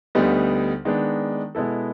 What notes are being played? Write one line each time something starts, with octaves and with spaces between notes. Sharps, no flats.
D2 D3 G3 B3 D#4
D#3 G#3 B3 D4
B2 G#3 B3 E4 A4